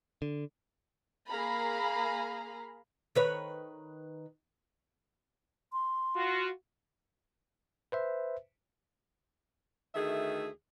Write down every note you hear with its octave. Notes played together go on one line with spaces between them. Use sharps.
D3
A#3 G#4 F5 A#5 B5
D#3 B4 C#5
C6
F4 F#4
B4 C5 E5
D2 D#3 A3 G#4 E5